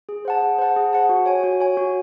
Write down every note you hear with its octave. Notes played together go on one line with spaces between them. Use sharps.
G#4
C5 F#5 A5
G#4
C5 F#5 A5
G#4
C5 F#5 A5
F#4
C#5 G#5
F#4
C#5 G#5
F#4